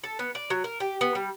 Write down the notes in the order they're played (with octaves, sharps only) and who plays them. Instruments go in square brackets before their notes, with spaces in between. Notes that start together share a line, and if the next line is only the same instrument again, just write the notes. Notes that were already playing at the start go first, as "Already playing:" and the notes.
[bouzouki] A4
B3
D5
F#3
A#4
G4
B3
G3